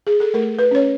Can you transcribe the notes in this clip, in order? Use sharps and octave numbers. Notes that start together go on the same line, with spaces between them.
G#4
A4
A3 A#4
B4
C#4 C#5